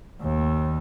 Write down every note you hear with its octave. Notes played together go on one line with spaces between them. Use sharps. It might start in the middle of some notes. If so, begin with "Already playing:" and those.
D#2